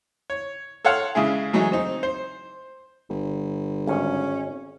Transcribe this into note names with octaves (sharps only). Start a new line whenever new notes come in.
C#5
A4 C#5 F5 F#5 C6 F6
C#3 G#3 E4 G#4
E3 F#3 G#3 A3 D#4
C4 D#4
C5
G1
G#1 C#4